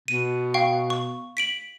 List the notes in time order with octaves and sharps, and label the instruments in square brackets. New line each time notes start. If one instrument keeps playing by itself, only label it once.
[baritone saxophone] B2 [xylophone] D#7
[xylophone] F5 G5 C#6
C#6
B6 D7 F#7